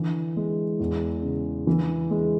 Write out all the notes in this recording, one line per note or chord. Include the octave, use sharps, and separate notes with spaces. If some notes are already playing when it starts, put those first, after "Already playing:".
Already playing: D3 E3
G#3
E2
C#3
E3
G#3